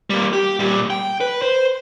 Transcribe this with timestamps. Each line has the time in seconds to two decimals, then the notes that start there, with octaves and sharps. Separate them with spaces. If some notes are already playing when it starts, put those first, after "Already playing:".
0.10 G3 A#3
0.33 G4
0.60 A#2 G3
0.90 G5
1.21 B4
1.42 C5